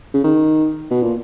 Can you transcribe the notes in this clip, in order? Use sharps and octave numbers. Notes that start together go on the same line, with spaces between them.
C#3
D#3
B2
A#2